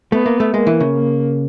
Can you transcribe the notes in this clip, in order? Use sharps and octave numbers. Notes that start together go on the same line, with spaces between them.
A3 B3
A#3
A3
G#3 A#3
E3
C#3
A#3